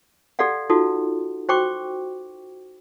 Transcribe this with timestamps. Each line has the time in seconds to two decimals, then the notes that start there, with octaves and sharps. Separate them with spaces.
0.39 G4 A4 D5 F5 F#5
0.70 D#4 F4 F#4 A4
1.49 F#4 C5 G5 C#6 D6